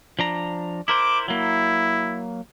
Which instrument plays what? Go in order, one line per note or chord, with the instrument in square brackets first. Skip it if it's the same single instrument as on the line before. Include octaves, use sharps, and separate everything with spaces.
[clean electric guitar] F3 D4 A#5
[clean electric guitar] E4 A#4 C5 [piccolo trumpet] D6
[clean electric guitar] F#3 A#3 [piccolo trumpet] E4